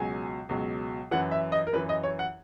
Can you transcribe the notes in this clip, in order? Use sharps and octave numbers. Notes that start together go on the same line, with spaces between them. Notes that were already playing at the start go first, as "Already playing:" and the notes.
Already playing: C#2 B2 F#3 G#5
C#2 B2 F#3
F#2 E3 F#5
E5
D#5
A#4
F#2 E3 B4
D#5
C#5
F#5